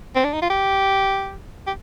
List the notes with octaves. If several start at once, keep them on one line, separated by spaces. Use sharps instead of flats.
C4
D4
D#4
F4
G4
G4